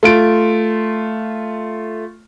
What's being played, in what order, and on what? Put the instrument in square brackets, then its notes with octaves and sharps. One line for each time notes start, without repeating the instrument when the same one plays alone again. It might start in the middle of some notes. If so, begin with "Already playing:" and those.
[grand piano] A3 F4 D7